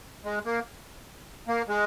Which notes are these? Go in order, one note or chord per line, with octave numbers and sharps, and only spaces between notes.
G#3
A#3
A#3
G#3